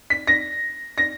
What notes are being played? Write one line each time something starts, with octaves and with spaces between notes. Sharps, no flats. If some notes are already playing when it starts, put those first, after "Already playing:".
B6
A#6
A#6